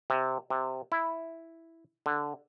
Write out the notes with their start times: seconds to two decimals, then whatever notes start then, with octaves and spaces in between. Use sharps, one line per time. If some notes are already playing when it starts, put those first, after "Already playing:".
0.10 C3
0.50 C3
0.92 E4
2.06 D3